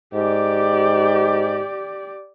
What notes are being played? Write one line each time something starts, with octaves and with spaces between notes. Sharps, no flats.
G#2 G4 D5